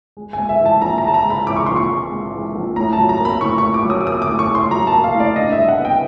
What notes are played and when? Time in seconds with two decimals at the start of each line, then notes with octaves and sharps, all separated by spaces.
0.17 G#3
0.33 G#5
0.39 G#2
0.49 E5
0.60 E3
0.66 A5
0.81 A#1 A#5
0.98 A#5
1.04 G#3 A5
1.14 A#5
1.25 G#2
1.30 B5
1.47 E3 D6
1.56 C#6
1.66 A#1 C6
1.76 C#6
1.90 G#3
2.12 G#2
2.33 E3
2.55 A#1
2.76 A2 A#5
2.93 A5
2.98 F#3
3.09 A#5
3.20 A#3
3.25 B5
3.41 A2 C#6
3.58 A2 C#6
3.74 D6
3.85 F#3
3.90 D#6
4.01 D6
4.07 A#3 D#6
4.22 D6
4.28 A2
4.39 C#6
4.50 A2
4.55 C6
4.71 F#3 A#5
4.87 A5
4.93 A#3
5.04 F5
5.14 A2
5.20 D5
5.36 D4 D#5
5.52 E5
5.58 G3
5.68 F#5
5.79 B3
5.85 G5